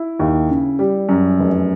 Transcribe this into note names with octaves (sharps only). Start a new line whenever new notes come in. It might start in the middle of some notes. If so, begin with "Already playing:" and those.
Already playing: E4
D#2
C#3
G3
F#2
F1